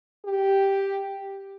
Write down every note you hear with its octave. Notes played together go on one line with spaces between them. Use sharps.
G4